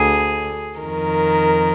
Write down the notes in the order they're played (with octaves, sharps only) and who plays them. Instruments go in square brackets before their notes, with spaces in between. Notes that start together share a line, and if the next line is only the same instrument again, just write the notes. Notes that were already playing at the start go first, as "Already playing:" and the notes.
Already playing: [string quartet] D2 D3 G#4
F2 D#3 A#4